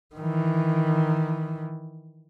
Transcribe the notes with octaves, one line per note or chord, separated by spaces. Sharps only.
D#3 E3